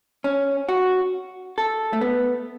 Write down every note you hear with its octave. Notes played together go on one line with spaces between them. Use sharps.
C#4
F#4
A4
A3
B3